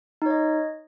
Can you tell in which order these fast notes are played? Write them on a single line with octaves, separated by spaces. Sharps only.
D#4 C#5 D#5